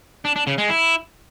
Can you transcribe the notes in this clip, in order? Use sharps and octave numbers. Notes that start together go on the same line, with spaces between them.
D4
D4
C#3
G#3
E4